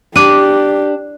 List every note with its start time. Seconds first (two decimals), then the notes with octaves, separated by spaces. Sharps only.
0.16 D4 G4 D6 F#6 D#7